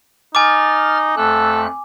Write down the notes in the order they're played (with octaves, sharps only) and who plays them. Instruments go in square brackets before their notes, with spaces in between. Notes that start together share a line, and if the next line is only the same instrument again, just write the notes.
[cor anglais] D#4 [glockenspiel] G#5 D6 [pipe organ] F6 A6
[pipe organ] F2 A3 F#6 [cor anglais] A4